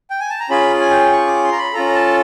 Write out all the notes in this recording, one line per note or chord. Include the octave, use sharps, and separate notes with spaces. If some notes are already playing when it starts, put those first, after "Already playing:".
G5
G#5
A5
A#5
C#4 F4 G#4 B5
G#5
G5
C#6
D6
C6
A#5
B5
C#4 F4 A4 A#5
A5